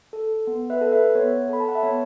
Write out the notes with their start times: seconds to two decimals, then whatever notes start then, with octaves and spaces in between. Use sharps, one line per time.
0.13 A4
0.47 B3
0.70 B4 E5
0.81 A4
0.92 B4 E5
1.15 B3 C#5
1.49 A4 B5
1.60 A5
1.68 F#5
1.75 E5
1.82 B3 C#5